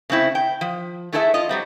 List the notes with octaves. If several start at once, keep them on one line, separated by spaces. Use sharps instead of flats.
C#3 A3 C4 E4
G5
F3
A3 E4 G#4 A4 D5 E5
F4 D#5
F#3 G3 C4